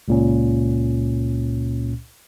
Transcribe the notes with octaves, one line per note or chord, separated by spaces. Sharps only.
C#2 A#2 C#4